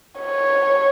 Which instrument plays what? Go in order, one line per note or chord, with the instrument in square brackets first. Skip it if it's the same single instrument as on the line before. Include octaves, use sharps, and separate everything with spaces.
[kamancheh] C#5